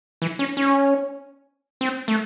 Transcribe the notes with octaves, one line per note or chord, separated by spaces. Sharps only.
E3
C#4
C#4
C4
A3